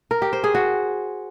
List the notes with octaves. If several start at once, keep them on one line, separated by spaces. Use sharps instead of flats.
A#4
G4
C5
G#4
F#4